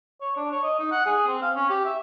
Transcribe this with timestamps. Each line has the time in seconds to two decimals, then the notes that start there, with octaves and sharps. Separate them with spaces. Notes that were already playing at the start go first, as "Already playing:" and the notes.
0.21 C#5
0.36 D4
0.51 C#5
0.63 D#5
0.79 D#4
0.91 F#5
1.06 G#4
1.27 C4
1.42 F5
1.56 C#4
1.70 G4
1.85 E5